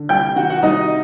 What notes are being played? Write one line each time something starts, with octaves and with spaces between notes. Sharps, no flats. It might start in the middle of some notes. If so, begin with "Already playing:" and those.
Already playing: D3
C2 G5 G6
D#3 F#4 F#5
F#4 F#5
C2 D#4 D#5